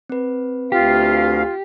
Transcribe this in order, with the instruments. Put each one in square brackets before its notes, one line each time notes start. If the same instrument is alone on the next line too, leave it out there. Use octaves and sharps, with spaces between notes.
[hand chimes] C4 B4
[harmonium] D2 F5 [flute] F4 [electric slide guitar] G4